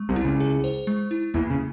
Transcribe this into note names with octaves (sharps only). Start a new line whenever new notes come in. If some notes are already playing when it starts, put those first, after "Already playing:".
Already playing: G#3
C2 C3
E4
C#2 C#3
G#4
C5
G#3
E4
E2 E3 A#3
C#3